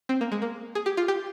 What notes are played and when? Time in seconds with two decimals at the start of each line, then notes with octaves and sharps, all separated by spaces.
0.09 C4
0.21 A#3
0.32 G#3
0.42 A#3
0.75 G#4
0.86 G4
0.97 F4
1.08 G4